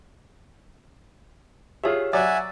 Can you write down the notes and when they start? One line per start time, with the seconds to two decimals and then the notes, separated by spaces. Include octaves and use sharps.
1.84 F4 G4 G#4 C#5 E5
2.13 F#3 D5 E5 F#5 G#5 E6 A6